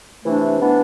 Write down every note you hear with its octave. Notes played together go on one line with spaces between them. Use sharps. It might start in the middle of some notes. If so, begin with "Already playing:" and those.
C3 E3 A3 D4
E3 B3 D4